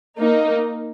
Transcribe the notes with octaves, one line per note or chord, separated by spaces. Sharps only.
A#3 D#4